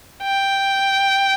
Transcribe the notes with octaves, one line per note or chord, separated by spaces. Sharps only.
G5